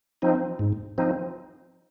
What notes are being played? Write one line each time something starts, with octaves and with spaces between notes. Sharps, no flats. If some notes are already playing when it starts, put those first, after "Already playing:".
F3 C4 D#4
G#2
F3 C4 D#4